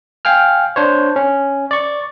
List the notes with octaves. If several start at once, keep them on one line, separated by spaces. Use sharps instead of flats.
F5 G5 G#5 F6
D4 C5 C#5
C#4
D5 C#6